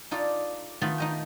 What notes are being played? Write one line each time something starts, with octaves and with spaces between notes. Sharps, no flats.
D#4 F4 A4 D5
D#3 A3 B3 F4
D#4 D#5 G5